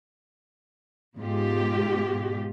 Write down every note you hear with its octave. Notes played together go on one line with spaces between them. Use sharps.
G#2 B2 G#3 F4 G4